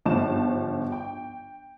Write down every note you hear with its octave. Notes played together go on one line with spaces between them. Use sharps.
G1 G#2 F3 A5 E7
G5